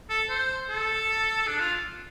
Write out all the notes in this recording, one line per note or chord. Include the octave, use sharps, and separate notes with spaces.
A4
C5
A4
D4
F4